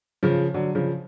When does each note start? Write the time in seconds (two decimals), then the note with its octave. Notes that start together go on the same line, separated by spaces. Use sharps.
0.23 C#3 F3
0.54 D3 F#3
0.75 C#3 F3